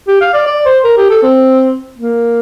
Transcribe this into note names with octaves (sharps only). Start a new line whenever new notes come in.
G4
F5
D5
D5
C5
A#4
G4
A4
C4
A#3